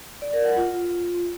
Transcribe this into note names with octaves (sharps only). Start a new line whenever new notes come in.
D5
A#4
F#5
F4